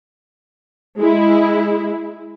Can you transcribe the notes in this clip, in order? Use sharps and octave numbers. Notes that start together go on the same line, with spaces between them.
G#3 E4